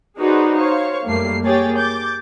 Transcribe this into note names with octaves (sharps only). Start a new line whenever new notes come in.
D#4 F#4 G#4 B4 C5 D5
C5 C#5 F5 C#6
F#2 G3 A3 A#3 C7
A#3 G4 G#4 C#5 G5 A6
D6 G6 A6